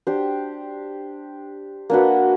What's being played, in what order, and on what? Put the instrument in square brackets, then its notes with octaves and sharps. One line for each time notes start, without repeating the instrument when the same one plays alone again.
[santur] D4 G4 C5
A#3 D4 F#4 B4